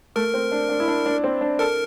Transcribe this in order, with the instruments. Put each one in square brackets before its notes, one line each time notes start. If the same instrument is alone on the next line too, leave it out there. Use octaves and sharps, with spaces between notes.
[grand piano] A3 [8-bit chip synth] A#4
[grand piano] C4
D4
D4
E4
D4
D4
C4
D4
[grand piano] A4 [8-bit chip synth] A#4